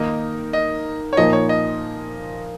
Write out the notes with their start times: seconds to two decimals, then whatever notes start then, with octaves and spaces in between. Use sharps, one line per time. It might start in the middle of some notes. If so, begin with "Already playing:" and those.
Already playing: D#3 A#3 D#4 A#4 D#5
0.53 D#5
1.13 C#5
1.17 A#2 F3 A#3 D#4 D#5
1.33 C#5
1.49 D#5